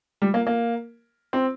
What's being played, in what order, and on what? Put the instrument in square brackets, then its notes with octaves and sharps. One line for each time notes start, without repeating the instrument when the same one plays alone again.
[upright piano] G3
A#3
A#3
C4